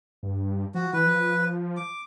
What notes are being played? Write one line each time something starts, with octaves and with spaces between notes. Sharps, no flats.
G2
F3 F#4
E3 B4
F3
D6